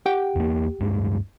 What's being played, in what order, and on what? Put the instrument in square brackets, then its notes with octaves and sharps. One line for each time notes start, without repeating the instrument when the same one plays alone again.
[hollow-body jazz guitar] G4 F#5 G5
[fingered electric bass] E2 A#3
D1 G2 G#3